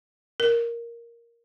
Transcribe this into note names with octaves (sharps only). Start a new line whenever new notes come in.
A#4